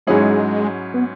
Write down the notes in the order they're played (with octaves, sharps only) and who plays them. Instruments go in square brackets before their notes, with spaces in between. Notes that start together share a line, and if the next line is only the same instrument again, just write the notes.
[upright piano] G#2 F#3 C#4 E4 G#4 [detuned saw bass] G#3
[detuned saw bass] B3